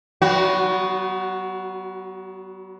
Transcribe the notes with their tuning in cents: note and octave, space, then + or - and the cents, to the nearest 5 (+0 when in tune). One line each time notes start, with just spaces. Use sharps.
F#3 +45 B3 +0 F#4 +0